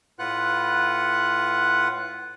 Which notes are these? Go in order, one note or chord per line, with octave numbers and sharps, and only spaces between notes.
A2 F4 B4 F#5 F#6